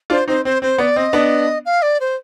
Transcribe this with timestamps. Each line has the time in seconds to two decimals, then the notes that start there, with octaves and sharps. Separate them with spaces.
0.10 D4 F4 C5
0.28 C4 D#4 C5
0.45 C4 C5
0.62 C4 C5
0.78 B3 D5
0.96 C4 D#5
1.13 B3 D4
1.65 F5
1.82 D5
2.00 C5